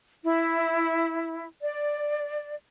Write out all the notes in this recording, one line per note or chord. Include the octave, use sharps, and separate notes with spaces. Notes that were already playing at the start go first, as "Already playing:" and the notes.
E4
D5